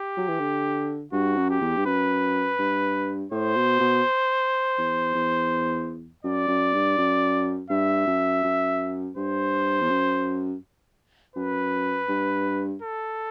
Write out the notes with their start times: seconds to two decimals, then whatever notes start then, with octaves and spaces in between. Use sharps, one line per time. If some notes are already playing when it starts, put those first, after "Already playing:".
Already playing: G4
0.17 F#3
0.29 E3
0.39 D3
1.12 G2 F#4
1.37 F#2
1.50 G4
1.61 E2
1.76 G2
1.86 F#2 B4
2.59 G2
3.31 A2 C5
3.56 B2
3.80 B2
4.78 E2
5.14 E2
6.24 F#2 D5
6.49 F#2
6.73 G2
6.98 F#2
7.70 G2 E5
8.07 F#2
8.44 F#2
9.16 G2 C5
9.81 E2
9.90 F#2
11.36 F#2 B4
12.09 G2
12.82 A4